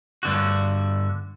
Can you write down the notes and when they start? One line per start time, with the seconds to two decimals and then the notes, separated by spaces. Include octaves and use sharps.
0.23 G2 D3 F#4